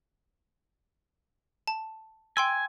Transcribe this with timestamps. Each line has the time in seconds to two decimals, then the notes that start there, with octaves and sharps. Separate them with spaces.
1.68 A5
2.37 G5 G#5 C6 E6